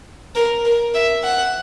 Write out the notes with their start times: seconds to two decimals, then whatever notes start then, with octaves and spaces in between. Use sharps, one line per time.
0.35 A#4
0.65 A#4
0.94 E5
1.24 F#5